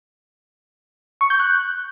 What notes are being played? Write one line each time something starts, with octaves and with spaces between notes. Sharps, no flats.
C#6
G6
F#6